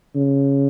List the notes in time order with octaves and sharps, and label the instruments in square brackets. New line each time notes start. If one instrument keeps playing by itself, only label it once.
[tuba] C#3